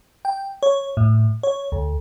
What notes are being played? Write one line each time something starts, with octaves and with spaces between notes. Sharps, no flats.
G5
C#5
A2
C#5
D2